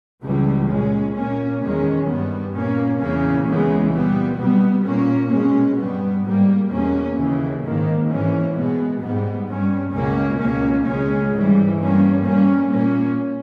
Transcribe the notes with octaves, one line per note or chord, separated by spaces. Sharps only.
C#2 C#3 E3 G3
A#2 G#3 C#4
A#2 A#3 C#4
E2 D#3 G#3 C#4
G2 G3 B3
A#2 A#3 C#4
E2 C#3 E3 A#3 C#4
C#2 C#3 E3 G#3 B3
A#2 G3 B3
B2 G3 B3
A#2 A#3 C#4
B2 G#3 C#4
G2 G3 B3
G#2 G3 A#3
E2 B2 A#3 C#4
D#2 C#3 E3
G#2 D#3 A#3
G#2 E3 A#3 C#4
B2 G#3 B3
G#2 G3 B3
G2 G3 C#4
C#2 B2 A#3 C#4
C#2 B2 A#3 C#4
C#2 C#3 G#3 C#4
G#2 E3 G3
G2 G3 A#3 C#4
G2 G3 A#3 C#4
A#2 A#3 C#4